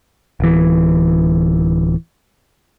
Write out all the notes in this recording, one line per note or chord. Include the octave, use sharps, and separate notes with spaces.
D1 E3